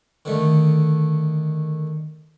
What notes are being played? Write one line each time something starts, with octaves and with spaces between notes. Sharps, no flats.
D3 D#3 A3